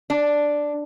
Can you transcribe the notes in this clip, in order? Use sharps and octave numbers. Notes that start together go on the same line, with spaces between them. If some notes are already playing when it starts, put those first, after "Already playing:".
D4